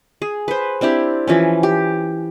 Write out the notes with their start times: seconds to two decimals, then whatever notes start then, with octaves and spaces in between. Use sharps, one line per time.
0.22 G#4
0.48 B4 C5
0.81 C4 D4 E4 G4
1.27 E3 F3 C#4
1.63 G4